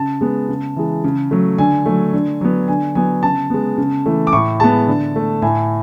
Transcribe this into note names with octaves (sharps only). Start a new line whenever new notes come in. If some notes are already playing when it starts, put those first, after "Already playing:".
Already playing: C#3 A5
G#3 B3
C#3
E3 G#3
C#3
F#3 A3
D3 G#5
F#3 A3
D3
F#3 B3
D3 G#5
F#3 B3 G#5
C#3 A5
G#3 B3
C#3
E3 A3
D6
A2 C#6
G#3 B3 A5
D3
A3
A2 G#5